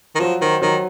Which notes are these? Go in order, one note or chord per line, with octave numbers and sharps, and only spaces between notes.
D#3
F3 F#3
D#3 C5
D#3 F#3